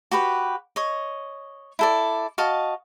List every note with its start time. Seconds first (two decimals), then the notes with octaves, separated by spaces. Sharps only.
0.11 F#4 G4 B4 B5
0.76 C#5 D#5
1.79 E4 A4 D5
2.38 F#4 D#5 F5 A5